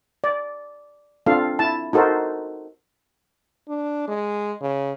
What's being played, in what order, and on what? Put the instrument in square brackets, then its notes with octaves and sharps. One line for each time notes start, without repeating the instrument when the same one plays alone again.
[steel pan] D5
C4 D4 F4 A4 F5
E4 A5
D#4 F#4 A4 A#4 C5
[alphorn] D4
G#3
C#3